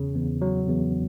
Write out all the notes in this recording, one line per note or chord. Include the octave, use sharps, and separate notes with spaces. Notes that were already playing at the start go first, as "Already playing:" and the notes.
Already playing: E2 C#3
E2
F#3
E2